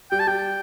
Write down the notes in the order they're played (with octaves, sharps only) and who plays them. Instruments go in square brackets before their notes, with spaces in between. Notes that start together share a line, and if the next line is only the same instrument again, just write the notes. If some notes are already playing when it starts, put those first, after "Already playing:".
[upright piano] G3 [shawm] G5
[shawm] A5
[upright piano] G3 [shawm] G5